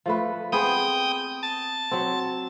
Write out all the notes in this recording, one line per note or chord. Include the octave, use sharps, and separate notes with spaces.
F3 A3 B4
B3 C4 G#4 G5 D#6
A5
F#3 C4